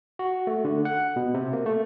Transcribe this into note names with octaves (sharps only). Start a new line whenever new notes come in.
F#4
A3
D3
F#5
B2
C3
A#3
A3